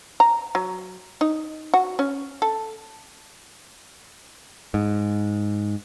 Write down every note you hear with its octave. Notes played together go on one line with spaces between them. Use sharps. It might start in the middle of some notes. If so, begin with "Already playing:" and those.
A#5
F#3
D#4
F#4
C#4
A4
G#2